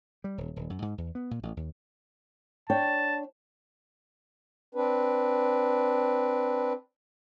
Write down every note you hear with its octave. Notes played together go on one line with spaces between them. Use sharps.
G3
D#1
D#1
F#2
G#2
E2
B3
A#2
A1
D#2
D4 C#5 G5 A5
C4 D4 B4